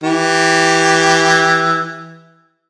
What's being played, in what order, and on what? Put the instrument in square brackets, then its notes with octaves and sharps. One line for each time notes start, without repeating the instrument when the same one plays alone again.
[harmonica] E3 G4